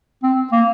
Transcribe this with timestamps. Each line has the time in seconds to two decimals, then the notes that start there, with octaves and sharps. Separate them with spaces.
0.23 C4
0.52 A#3